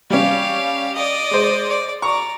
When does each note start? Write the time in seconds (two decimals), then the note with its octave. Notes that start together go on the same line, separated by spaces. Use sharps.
0.10 G3 C#4 G4 F5
0.95 D5 D#5
1.31 G#3 C5
1.68 D5
2.02 D5 A#5 C#6